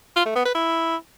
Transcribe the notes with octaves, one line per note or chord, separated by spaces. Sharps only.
F4
A3
B3
B4
E4